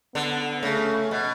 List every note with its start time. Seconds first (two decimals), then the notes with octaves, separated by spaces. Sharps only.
0.14 D3 B3
0.63 C#3 A3
1.11 B2